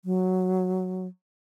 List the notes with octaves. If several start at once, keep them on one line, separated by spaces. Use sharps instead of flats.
F#3